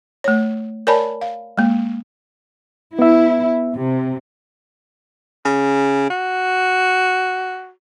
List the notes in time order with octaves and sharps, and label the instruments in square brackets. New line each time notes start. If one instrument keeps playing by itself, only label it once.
[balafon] A3 C#5
A#4 C#5 D5 G#5 A5 B5
F5
G#3 A#3
[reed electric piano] B3 E5 [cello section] E4
[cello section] C3
[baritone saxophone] C#3
F#4